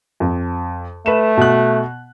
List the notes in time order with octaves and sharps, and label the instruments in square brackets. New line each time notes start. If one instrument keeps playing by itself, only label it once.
[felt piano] F2
[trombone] A3 [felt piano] B4 E7
[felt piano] B2 F#6